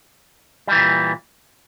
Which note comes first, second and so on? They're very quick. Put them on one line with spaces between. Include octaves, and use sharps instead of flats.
G3 E3 A#2